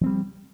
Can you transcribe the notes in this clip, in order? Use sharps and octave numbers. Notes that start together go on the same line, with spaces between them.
F3 G3 C4